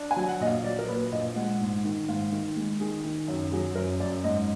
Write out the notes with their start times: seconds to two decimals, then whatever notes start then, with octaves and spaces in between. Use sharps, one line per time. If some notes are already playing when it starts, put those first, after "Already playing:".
Already playing: D4
0.11 G#5
0.16 F#3
0.28 F#5
0.40 A#1 D#5
0.47 F5
0.64 F#3 D5
0.79 A#4
0.88 A#2 B4
1.12 A#1 D#5
1.36 G#3 F#5
1.61 G#2
1.84 D#3
2.08 G#2 F5
2.32 D#3
2.56 G#3
2.80 D#3 G#4
3.04 D#3
3.28 F#2
3.52 F#3 G#4
3.75 F#2 A#4
4.00 F#2 D5
4.24 G#2 D#5